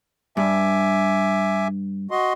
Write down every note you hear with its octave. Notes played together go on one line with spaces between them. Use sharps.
G2 E5 G#5 D6
F#4 D#5 C6